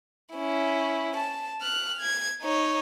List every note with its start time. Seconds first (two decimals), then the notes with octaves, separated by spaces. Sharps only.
0.34 C#4 E4
1.16 A5
1.62 F6 F#6
2.01 G#6
2.42 D#4 C#5